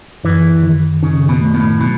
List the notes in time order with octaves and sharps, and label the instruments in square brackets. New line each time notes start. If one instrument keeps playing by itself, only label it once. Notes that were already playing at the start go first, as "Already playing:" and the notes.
[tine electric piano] F#2 [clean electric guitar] E3
[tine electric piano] D#3
[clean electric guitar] C#3 [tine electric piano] D#4
[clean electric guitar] B2
[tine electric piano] A3
[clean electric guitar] A2
[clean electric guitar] B2 [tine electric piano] F#3